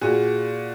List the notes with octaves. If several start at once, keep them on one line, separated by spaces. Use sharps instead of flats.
A#2 F#4 G#4